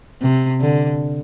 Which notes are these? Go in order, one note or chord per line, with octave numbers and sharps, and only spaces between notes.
C3
D3